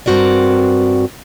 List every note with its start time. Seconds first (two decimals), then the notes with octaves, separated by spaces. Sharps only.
0.06 G2 C4 F#4 A#4 D5